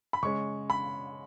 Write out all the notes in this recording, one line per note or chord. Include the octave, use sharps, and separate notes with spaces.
B5
C#3 G#3 C#4 C#6
B5